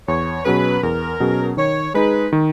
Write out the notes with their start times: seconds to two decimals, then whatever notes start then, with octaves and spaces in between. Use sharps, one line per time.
0.08 E2 C#5
0.45 B2 F#3 C#4 G#4 B4
0.83 E2 A#4
1.20 B2 F#3 C#4 G#4
1.57 D#3 C#5
1.94 G#3 D#4 G#4 B4
2.33 D#3